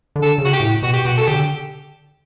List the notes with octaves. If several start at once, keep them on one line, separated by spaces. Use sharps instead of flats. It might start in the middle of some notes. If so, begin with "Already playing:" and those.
D3
A4
C#3
F#4
G4
A2
B2 F#4
G4
B2 F#4
A4
D3 G4